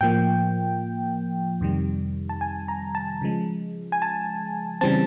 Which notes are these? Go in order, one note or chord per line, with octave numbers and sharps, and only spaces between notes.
A2 F3 A#3 G5
F2 C3 D#3 G3
A5
G#5
A#5
A5
C#3 F3 G#3
G#5
A5
C#3 E3 G3 C4 A5